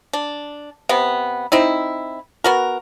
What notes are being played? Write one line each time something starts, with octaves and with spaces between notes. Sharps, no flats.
D4
C3 B3
C4 D#4 E4
B3 F#4 A#4